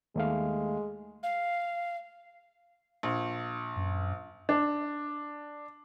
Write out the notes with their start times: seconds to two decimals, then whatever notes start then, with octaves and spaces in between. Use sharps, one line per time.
0.16 D#2 G#3 A3 F5
1.23 F5
3.03 A#1
3.76 F#2
4.49 D4